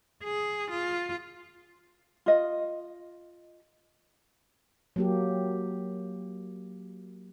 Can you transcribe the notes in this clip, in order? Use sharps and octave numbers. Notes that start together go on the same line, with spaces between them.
G#4
F4
F4 D#5
F#3 A#3 G4